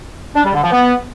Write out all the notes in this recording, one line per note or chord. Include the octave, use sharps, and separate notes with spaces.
D4
G3
D3
F3
B3